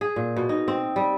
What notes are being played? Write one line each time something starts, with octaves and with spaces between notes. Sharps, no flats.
G#4
A#2
B2
D#4
C4
G3